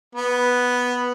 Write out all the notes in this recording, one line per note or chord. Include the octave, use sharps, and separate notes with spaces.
B3